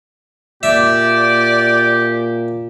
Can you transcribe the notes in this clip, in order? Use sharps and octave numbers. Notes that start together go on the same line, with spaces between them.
A#2 G4 D5 E5